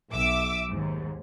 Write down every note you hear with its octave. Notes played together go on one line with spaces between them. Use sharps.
B1 E5 D6 E6
D#2 G#2